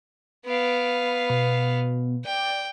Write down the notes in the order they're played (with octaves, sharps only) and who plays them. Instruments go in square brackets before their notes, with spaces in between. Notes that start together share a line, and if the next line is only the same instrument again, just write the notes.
[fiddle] B3 F5 [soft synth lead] D7
[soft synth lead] B5
B2
[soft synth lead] D5 [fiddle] G5